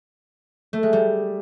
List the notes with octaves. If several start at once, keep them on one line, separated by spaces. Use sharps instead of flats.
A3
G#3
G3